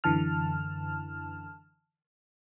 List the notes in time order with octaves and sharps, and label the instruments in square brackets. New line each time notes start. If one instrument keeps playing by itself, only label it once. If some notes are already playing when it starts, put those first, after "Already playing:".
[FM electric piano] F#2 D3 E3 A5 F6